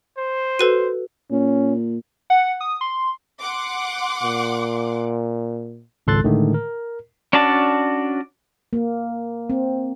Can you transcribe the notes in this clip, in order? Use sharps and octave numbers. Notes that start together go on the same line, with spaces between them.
C5
F#4 A4 B4 D#7
A#2 C#4
F#5
D#6
C6
F#5 C6 D6
A#2
G#1 C#2 A4 C6 F#6 A6
A2 D3 D#3 G#3 A3
A#4
C#4 D4 F#4 D5 A5
A#3
C4